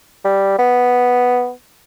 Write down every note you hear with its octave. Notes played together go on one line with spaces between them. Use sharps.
G3
B3